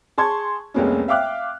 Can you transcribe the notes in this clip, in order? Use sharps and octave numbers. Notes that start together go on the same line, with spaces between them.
G#4 A5 C6 C#6 G#6
F1 C2 G#3 A#3 B3 C#4
E5 F5 G5 D6 F6 F#6